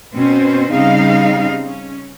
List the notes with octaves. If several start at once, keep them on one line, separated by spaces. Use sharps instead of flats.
B2 C4 C#4 C5
C#3 G3 C4 D#4 F5
C#4